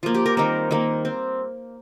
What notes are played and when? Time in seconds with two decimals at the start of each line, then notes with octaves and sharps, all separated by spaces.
0.03 F3 A#3 F4
0.14 G4
0.26 A#4
0.37 D#3 G3 C4 A#4
0.71 D#3 A#3
1.05 C4